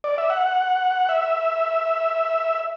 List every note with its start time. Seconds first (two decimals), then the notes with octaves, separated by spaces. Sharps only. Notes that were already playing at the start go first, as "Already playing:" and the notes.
0.04 D5
0.18 E5
0.30 F#5
1.09 E5